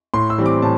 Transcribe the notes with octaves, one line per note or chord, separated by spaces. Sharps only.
A2 C6
E6
E3 G3 C4
D6
A2 A5